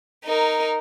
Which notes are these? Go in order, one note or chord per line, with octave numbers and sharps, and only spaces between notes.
D#4 A#4